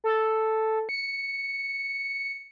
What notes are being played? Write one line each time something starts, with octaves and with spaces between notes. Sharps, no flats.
A4
C#7